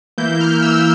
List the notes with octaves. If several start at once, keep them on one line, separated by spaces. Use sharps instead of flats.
E3 A#3 E4 G6
F6
E6